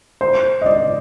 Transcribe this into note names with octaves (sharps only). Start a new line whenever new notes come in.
C5
D#5
D5